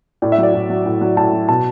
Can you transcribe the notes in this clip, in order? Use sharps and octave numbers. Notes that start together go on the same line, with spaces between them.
A2 D5
E5
F#3
D5
A2
F#3
A2
F#3
A2 A5
F#3
B2 A5